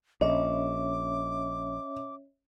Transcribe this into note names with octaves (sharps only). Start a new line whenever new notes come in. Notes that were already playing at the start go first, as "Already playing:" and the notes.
A#1 C#4 C#5 D#5 E5 D6